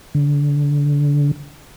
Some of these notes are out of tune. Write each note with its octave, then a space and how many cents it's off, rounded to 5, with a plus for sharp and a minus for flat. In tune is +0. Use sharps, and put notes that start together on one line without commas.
D3 -25